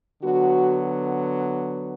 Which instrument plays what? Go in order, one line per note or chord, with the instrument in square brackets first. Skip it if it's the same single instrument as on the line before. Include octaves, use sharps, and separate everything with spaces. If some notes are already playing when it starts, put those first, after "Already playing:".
[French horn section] D3 F#3 B3 F#4